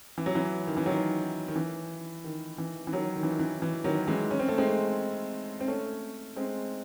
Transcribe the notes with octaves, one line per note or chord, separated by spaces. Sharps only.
E3
F#3
E3
D#3
E3
D#3 F#3
D#3
E3
D#3
E3
E3
D#3 F#3
D#3
E3
D#3
E3
E3
D#3 F#3
E3 G#3
C#4
C4
A3
G#3 C4
C4
A3 C#4
G#3 C4